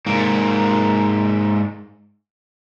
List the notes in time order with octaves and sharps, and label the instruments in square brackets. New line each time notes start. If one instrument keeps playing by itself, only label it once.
[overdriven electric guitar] G#2 A#3